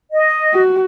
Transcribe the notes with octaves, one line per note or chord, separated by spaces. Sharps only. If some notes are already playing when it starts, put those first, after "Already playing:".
D#5
F#4